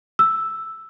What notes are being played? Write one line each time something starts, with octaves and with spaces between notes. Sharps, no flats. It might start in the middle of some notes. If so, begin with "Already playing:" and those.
E6